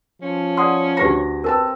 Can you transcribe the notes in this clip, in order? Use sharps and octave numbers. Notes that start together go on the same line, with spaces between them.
F3 C#4
D5 F#5 C6 D#6
D2 G4 B4 A#5 A#6
C4 A#4 B4 A5 E6